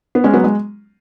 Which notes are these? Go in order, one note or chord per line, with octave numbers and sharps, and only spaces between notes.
B3
G#3 C#4
F#3 B3
G#3